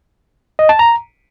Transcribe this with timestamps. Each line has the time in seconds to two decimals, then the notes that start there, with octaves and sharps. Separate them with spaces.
0.59 D#5
0.69 A5
0.79 A#5